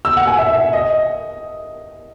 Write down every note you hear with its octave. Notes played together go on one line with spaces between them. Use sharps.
E6
F#5
G#5
E5
D#5